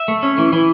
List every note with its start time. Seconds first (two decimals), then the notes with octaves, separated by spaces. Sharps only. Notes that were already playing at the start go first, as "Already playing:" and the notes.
Already playing: E5
0.08 A3
0.23 C#4
0.38 E3
0.53 E3